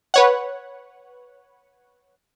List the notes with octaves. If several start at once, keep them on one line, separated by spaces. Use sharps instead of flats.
B4 C#5 F#5